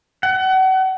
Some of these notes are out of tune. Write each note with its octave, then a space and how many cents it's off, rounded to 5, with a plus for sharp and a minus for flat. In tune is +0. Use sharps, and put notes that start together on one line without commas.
F#5 +35